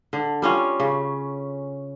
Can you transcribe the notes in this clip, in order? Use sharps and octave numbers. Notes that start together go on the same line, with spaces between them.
D3
G3 C#4 F4
C#3